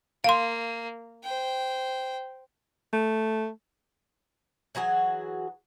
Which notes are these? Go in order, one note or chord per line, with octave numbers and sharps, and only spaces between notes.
A#3 F5 C6
C5 G5
A3
E3 F#3 F#4 G#4